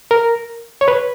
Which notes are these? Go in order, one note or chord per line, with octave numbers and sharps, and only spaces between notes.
A#4
C#5
B4